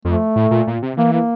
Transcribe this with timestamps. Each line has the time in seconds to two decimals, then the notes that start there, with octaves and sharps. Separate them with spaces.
0.05 F2 A3
0.36 A2
0.51 A#2
0.67 A#2
0.82 C3
0.97 E3 A#3
1.13 A#3